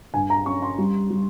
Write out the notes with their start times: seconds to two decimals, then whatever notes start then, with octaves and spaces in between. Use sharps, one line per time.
0.14 G2 G#5
0.30 A#5
0.46 C#4 C#6
0.62 C6
0.78 G3
1.10 G3